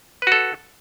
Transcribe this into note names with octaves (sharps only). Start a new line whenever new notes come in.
F#4 A4 B4